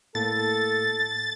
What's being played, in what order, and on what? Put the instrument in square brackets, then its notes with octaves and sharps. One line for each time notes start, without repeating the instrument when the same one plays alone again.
[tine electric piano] A2 A#3 [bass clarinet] A4 [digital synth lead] A6